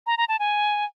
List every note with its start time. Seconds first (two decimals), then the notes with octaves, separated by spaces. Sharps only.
0.07 A#5
0.18 A#5
0.29 A5
0.39 G#5